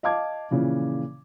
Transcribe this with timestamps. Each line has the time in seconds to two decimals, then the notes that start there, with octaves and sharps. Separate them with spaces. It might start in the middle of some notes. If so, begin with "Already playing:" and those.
0.03 D#5 F5 A5 D6 G#6
0.51 A#2 C#3 E3 F3